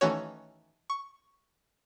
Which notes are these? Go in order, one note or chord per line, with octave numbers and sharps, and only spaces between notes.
D#3 E3 A3 C#4 F#4 C#5
C#6